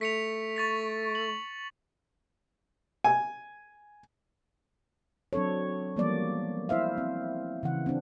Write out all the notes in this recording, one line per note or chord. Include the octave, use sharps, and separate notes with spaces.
A3 B6 C#7 F7
C#6 A6 B6
F#7
G#5
F#3 C4 D4 A4 C#5
E3 F3 G3 A#3 B3 D5
E4 C5 E5 F5
C4
C#3 E3 F#5
C4 D4